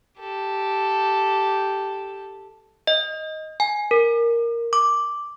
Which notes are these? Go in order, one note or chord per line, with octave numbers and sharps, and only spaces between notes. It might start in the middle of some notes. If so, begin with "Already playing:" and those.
G4 A4
D#5
G#5
A#4
D6